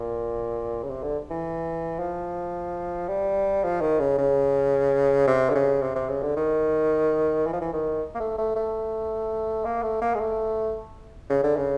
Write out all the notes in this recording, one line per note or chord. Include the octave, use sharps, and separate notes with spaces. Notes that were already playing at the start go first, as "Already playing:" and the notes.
Already playing: A#2
C#3
C3
D3
E3
F3
G3
F3
D#3
C#3
C#3
C3
D3
C#3
C3
C3
C#3
D3
D#3
E3
F3
E3
D#3
A#3
A3
A3
A3
A#3
A3
A#3
G#3
A3
C#3
D3
C#3